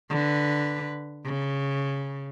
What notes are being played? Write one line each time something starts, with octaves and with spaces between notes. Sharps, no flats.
D3 B4
C#3